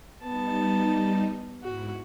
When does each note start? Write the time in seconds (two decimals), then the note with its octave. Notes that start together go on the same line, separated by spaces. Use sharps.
0.23 G3 B3 D#4 A5
1.63 G#2 E4 F#4